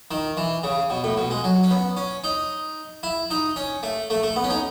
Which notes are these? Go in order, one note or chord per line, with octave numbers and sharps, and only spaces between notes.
D#3
E3
C#3
B2
A2
B2
G#3
F#3
C#4
B3
C#4
D#4
E4
D#4
C#4
A3
A3
A3
B3
C#4
D#4